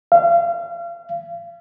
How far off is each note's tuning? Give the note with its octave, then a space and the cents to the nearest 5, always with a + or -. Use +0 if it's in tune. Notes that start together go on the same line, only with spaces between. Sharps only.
F5 -35